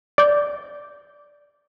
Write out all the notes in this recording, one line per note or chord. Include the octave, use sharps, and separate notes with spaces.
D5 G6